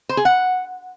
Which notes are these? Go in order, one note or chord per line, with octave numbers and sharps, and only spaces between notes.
C5
G#4
F#5